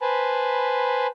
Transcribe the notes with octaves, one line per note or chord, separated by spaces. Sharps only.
B4 C5 G#5 A5 B5